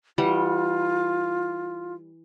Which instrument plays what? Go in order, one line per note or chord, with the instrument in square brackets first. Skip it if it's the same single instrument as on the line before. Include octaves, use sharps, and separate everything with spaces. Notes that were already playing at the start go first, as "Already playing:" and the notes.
[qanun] E3 G3 F#5 [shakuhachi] F4